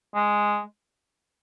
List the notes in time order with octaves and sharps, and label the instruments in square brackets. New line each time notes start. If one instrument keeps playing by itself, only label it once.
[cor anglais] G#3